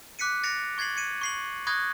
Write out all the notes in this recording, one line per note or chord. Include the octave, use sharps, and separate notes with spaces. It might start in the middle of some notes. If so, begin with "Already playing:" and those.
D6 F#6 B6 C#7 D#7
A6 A#6 C#7 D7 F7
C#6 G#6 A6 C7 F#7
G#6 C#7 D#7
C#6 C7 F#7
B5 C#6 D#6 F#6 G#6 A#6